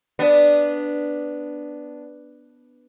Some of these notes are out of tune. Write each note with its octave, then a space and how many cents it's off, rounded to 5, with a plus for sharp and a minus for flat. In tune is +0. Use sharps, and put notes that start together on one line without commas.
B3 +0 D4 +0